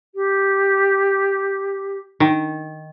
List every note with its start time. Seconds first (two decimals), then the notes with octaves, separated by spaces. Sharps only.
0.14 G4
2.20 D#3